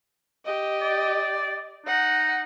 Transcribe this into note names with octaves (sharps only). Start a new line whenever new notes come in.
G4 D#5
D5
D#4 F#5